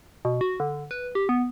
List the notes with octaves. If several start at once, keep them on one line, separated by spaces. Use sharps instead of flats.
B2
F#4
D3
B4
G4
B3